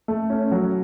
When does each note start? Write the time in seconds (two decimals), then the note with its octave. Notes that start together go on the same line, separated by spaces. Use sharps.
0.08 A3
0.30 C#4
0.52 F#3